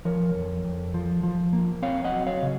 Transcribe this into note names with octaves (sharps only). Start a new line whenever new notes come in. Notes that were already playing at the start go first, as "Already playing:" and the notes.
F3 A#4 C#5
F2
F2
F3
F3
A#3
C4 C#5 F5
D#5 F#5
F#3
C#5 F5
C#3